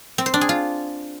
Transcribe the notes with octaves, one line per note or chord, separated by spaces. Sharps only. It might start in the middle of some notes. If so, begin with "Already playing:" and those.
C4
C5
D4
G#4
F4